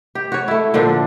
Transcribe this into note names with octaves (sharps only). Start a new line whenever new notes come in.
G4
F#4 C#5
A3 E4
A#2 D3 F3 D4